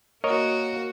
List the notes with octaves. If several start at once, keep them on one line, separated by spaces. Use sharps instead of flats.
A#3 F#4 A#4 C#5 D#5